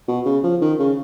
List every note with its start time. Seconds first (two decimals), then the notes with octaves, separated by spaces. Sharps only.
0.08 B2
0.26 C#3
0.43 F3
0.61 D#3
0.79 C#3